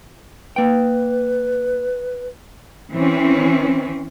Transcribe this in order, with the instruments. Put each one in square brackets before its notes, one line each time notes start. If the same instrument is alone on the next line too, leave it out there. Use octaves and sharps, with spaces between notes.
[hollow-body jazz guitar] A#3 G5 [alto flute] B4
[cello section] E3 C4 C#4